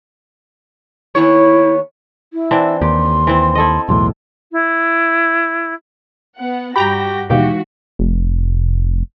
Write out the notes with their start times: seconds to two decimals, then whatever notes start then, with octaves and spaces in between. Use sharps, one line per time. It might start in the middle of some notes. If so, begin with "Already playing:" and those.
1.15 D#2 B3 E4 C#5
2.33 E4
2.51 E3 C4 D4
2.82 D#2 G4 C6
3.27 E3 C4
3.55 E4 A4 D#5
3.89 B1 E2 A2 C6
4.52 E4
6.37 B3 F#5
6.76 G2 F#4 G4 G5 A#5 B5 A#6
7.30 D#2 B2 E3 G#3 D#4 F#4 G4 F5
7.99 F1